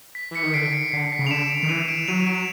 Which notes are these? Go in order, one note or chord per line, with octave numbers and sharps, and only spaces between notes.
B6
E3 B6 C#7
D#3
D3 C7 D7
B6 C#7
C#7
D3 C7
B6
C#3
F7
D3 D7 E7
D7 E7
D#3
E3 D#7 F7
D7 E7
F#3 D#7 F7
D7 E7